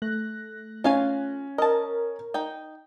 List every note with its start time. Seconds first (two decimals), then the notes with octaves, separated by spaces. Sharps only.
0.02 A3 F#6 A#6
0.84 C#4 F4 F5 G#5
1.58 A#4 D#5 A5
2.34 D#4 G5